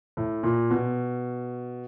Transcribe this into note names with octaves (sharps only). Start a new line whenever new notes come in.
A2
A#2
B2